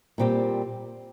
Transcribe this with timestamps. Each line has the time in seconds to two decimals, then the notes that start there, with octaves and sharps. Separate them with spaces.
0.18 A#2 G3 C4 G4